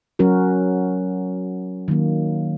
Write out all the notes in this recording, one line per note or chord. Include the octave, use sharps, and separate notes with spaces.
F#3 C#4 F#4 A#4
D#3 F#3 A#3